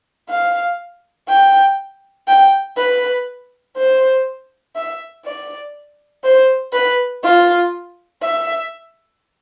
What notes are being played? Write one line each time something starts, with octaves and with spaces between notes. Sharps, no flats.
F5
G5
G5
B4
C5
E5
D5
C5
B4
F4
E5